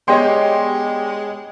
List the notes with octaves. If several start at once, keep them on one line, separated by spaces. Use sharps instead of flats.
G#3 B3 D4 G4 C#5 D#5 G5 C6